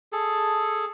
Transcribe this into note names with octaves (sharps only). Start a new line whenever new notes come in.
G#4 A4